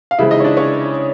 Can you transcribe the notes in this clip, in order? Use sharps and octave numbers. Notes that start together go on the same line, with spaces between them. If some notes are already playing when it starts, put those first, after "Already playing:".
F5
C#3 E3 G#3 C4 E4 E5
D#4 D#5
C#5
D4 D5
C#4 C#5